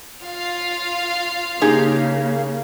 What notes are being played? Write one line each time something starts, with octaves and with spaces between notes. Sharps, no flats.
F4 F5
C#3 A#3 D#4 G4 G#4